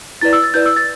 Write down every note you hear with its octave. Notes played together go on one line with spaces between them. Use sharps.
E4 B4 D5 A6
E6
A6
E4 B4 D5 G6
E6
A6